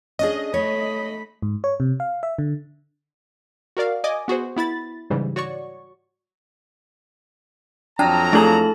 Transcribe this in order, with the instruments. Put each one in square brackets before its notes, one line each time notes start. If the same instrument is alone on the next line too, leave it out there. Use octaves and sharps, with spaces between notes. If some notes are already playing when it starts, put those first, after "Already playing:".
[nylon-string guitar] C#4 D4 G#4 [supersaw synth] D#5
[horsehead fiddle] A3 B5 [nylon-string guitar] C#5
[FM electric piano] G#2
C#5
C3
F5
E5
D3
[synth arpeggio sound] F#4 A#4 D5 F5
D5 D#5 G#5 D6 D#6
B3 F#4 G#4 C5
B3 E4 B5 A6
G#2 C#3 E3 G3
F#4 C#5 D5 C#6
[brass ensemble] F2 F#3 A#5 [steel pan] D4 [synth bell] G5 [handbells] A5 D#6 F6
[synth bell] A3 F#7 [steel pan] D4 G#4 [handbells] E4 A4 A5